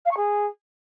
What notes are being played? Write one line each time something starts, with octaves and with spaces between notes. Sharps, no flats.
F5
C#6
G#4